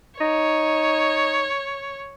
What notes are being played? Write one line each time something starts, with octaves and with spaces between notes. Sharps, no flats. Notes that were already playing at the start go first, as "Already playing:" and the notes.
D#4 C#5